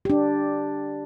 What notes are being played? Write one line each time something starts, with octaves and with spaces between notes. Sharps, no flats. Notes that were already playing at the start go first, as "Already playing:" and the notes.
D4 G4